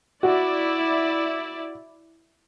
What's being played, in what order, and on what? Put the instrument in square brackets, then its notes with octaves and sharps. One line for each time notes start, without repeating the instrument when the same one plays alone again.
[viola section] E4 D5 [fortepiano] F#4